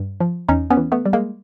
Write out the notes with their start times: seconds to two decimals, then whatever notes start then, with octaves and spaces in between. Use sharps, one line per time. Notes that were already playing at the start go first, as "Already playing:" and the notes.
Already playing: G2
0.20 F3
0.49 E2 C#4 D#4
0.70 B3 C#4
0.77 E3
0.92 A3 B3
1.06 G3
1.13 G#3 A#3